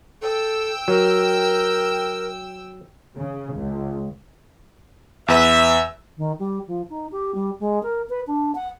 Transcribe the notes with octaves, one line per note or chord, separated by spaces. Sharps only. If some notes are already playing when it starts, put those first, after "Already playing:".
A4 G5 E6
F#3 A#4
C#3
C#2
E2 B4 E5 E6
D#3
G3
F3
D#4
G4
G3
G#3
A#4
B4
D4
F#5